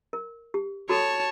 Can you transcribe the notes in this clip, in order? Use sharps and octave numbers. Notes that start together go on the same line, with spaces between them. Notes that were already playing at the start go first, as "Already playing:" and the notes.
A#4
G4
F#4 A4 C#5 A5